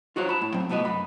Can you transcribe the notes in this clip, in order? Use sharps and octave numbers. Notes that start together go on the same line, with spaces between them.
F4 F#4 C5 C#5
A5 B5
A2
F#3 C4
C2 A3 B3 F#4 D#5
F#2 B5